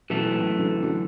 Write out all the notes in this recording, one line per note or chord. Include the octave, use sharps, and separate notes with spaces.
F#2 B2 E3 A3
A2
D3 F#3
D3 F#3